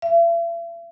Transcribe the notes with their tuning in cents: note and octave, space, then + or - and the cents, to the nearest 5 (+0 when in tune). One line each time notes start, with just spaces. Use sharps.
E5 +45